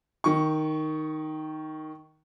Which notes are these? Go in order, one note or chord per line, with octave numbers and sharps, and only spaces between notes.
D#3 C#6